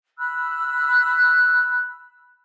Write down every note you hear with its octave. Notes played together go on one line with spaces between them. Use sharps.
B5 E6 F#6